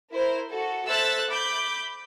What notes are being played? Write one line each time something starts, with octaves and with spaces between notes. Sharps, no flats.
E4 A#4 C5
F#4 A4
A4 C5 E5 E6 F#6 A6
B5 D6 G6